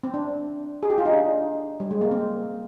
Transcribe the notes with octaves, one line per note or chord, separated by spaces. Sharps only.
C4
D4
G#4
G4
F4
D#4
D4
G3
G#3
A#3
C4